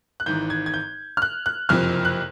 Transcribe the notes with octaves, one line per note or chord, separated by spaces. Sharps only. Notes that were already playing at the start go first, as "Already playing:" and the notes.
F#6
G#1 G#2 E3 G6
G#6
G#6
G6
F6
F#6
F#6
F#1 F2 C3 F3 F6
F#6